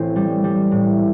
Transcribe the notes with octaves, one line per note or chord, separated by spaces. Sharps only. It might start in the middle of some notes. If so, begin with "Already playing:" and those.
Already playing: A1 C4
G3
G3
A2